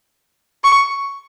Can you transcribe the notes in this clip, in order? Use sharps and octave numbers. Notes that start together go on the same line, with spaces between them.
C#6